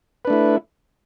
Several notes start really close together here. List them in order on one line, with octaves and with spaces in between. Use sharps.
B4 D4 A3 E4